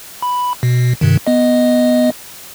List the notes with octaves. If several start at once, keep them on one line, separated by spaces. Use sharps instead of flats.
B5
B2
G2 C3 D#3
B3 D#5